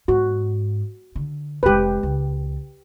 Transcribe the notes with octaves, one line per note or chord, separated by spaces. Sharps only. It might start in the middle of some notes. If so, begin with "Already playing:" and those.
G#2 F#4
D3
F1 G#3 G4 B4
C#2